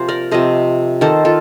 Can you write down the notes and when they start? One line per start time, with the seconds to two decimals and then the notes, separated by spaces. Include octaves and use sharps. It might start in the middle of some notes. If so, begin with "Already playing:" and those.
Already playing: C3 F3 A#3 C5
0.08 A#4 D5
0.31 C3 F3 A3 C5 D#5
1.01 D#3 A#3 A4 C5
1.25 F4 A4